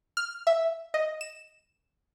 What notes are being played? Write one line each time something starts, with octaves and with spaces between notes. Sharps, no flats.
F6
E5
D#5
E7